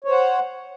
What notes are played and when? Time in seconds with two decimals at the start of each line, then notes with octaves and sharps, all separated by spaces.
0.04 C#5
0.08 C5
0.12 F#5